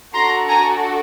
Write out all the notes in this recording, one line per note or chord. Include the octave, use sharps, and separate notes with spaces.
D4 F#4 A4 A#5 C6
G#5 A#5